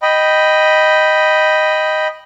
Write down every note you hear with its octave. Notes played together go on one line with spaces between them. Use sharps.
D#5 G5 B5